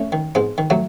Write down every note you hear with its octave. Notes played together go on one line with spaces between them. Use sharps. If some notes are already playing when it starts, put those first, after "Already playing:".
Already playing: A3 C#4
D#3
G#2 G#3 B3
D#3
F#3 A3